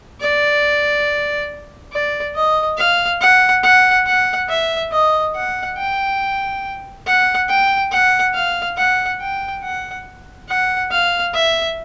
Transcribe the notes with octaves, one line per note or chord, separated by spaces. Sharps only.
D5
D5
D#5
F5
F#5
F#5
F#5
E5
D#5
F#5
G5
F#5
G5
F#5
F5
F#5
G5
F#5
F#5
F5
E5